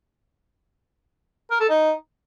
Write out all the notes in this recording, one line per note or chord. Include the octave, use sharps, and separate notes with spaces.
A#4
A4
D#4